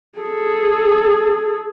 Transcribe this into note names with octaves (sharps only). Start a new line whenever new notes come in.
G#4 A4